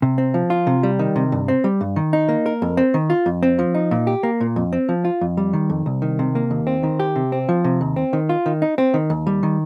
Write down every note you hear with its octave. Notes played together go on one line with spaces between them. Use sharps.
C3
C4
F3
F4
C3
G3
D#3
C3
G2
C4
G3
G2
D#3
D#4
A#3
A#4
F2
C4
D#3
F4
F2
C4
F3
D#4
A#2
G4
A#3
A#2
F2
C4
F3
F4
F2
G3
D#3
F2
C2
D#3
C3
A#3
D#2
C4
D#3
G4
C3
C4
F3
C3
D#2
C4
D#3
F4
D#3
D#4
C4
D#3
D#2
G3
D#3